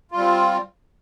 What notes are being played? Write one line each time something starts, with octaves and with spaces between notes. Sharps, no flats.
G3 C4 F4